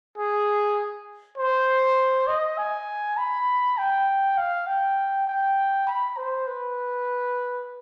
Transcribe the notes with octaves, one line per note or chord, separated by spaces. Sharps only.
G#4
C5
D#5
G#5
B5
G5
F5
G5
G5
B5
C5
B4